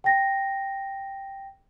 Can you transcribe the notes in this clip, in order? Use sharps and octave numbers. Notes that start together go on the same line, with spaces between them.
G5 A#6